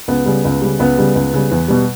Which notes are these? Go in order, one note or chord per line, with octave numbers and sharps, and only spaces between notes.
C#2 B3
C#3 G3
C#2
C#3 G3
C#2 B3
C#3 G3
C#2
C#3 G3
E2
B2 G3